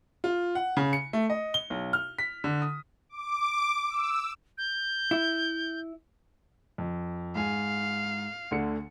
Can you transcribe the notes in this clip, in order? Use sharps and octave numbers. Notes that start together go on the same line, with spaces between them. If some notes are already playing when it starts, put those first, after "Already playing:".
F4
F#5
C#3
C#7
A3
D#5
G7
B1
F6
B6
D3
D#6
D6
E6
G6
E4
F2
G#2 F5 G#5
D2 D3 C#7